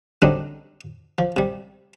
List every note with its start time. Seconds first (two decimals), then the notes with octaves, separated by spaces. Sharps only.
0.22 D3 F#3 G3 C4 D4 D#4
1.18 F3
1.36 C3 G3